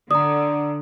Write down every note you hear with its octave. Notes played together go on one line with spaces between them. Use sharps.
D3 D5 A#5 D#6